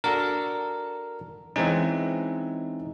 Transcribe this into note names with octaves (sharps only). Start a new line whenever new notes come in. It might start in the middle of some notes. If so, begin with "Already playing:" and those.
D4 F#4 A4 A#4
E3 G#3 C4 C#4 D#4